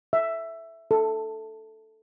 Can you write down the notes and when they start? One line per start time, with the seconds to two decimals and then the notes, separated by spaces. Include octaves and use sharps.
0.13 E5
0.91 A4